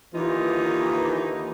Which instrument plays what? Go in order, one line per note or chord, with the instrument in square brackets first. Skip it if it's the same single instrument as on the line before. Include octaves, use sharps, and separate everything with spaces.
[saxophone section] D#2 D3 D#4 [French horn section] E3 A#3 [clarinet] F4